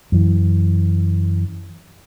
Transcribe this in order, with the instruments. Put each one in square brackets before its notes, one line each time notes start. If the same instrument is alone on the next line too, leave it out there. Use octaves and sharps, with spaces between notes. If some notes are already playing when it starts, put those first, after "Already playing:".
[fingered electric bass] F#2 E3